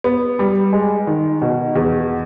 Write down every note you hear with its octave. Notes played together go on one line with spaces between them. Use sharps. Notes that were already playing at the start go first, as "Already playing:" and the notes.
B3
G3
G#3
D#3
B2
E2